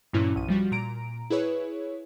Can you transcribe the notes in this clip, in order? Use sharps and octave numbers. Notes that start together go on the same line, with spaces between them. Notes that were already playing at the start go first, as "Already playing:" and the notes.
G2 A#2 E3 C#4 E4
B1 D#7
F3 G3 F#4
A#2 A#5 D7
E4 G#4 B4 C#5